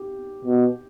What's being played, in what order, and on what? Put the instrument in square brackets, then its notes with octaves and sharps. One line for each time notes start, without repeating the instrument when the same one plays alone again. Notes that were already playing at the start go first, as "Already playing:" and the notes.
Already playing: [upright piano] G4
[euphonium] B2